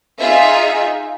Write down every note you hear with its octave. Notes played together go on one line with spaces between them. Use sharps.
D#4 F4 G#4 E5